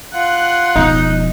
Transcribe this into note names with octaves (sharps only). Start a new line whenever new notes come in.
F4 F#5 F#6
E1 F3 D#4